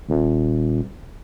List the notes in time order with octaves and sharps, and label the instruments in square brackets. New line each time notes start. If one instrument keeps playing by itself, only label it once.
[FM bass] D#1